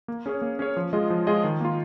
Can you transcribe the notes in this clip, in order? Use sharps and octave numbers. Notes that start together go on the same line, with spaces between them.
A#3
C#4 G#4 C#5
A#3
C#4 G#4 C#5
F3
G#3 F4 G#4 D#5
F3
G#3 F4 G#4 D#5
D#3
A#3 F4